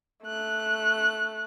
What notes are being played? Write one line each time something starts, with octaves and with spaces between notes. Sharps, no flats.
A3 F#6